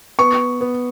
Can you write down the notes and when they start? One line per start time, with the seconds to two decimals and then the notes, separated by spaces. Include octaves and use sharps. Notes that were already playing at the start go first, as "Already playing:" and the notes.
0.19 B3 C#6
0.61 B3